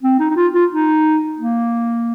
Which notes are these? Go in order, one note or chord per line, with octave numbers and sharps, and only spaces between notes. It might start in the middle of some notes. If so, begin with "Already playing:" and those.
C4
D#4
D#4
F4
F4
D#4
A#3